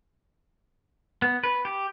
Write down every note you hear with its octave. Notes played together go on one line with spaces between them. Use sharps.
B3
B4
G4